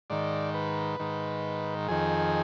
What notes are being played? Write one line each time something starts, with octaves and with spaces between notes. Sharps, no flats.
G#2 D#3 D5
B4
G#2 D#3
F2 D#3 G#4